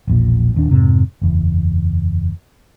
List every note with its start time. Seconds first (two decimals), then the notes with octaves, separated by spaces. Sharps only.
0.07 E1 A#1 A#2
0.54 D#1 D#2 D4
0.71 F2 G#2 C3
1.22 F#1 E2